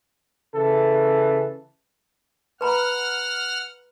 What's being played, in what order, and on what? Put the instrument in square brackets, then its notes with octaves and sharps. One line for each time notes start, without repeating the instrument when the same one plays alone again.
[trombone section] C#3 E3 A4
[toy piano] B4 A#5 B5 [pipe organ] F#5 F6